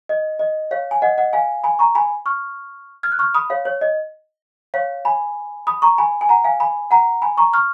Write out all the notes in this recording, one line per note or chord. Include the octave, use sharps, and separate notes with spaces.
D#5
D#5
C#5 F5
G#5
D#5 F#5
D#5 F#5
F5 G#5
G#5 B5
A#5 C#6
G#5 B5
C#6 F6
F6 G#6
F#6
C#6 F6
B5 D#6
C#5 F5
C#5
D#5
C#5 F5
G#5 B5
B5 D#6
A#5 C#6
G#5 B5
G#5
F#5 A#5
F5 G#5
G#5 B5
F#5 A#5
G#5 B5
A#5 C#6
C#6 F6